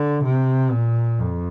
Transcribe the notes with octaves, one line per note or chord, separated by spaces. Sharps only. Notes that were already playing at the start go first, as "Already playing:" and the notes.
Already playing: D3
C3
A#2
F2